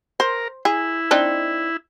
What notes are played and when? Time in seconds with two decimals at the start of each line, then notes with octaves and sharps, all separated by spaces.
0.20 A#4 C5
0.65 E4 G#4
1.11 C4 D4 D#4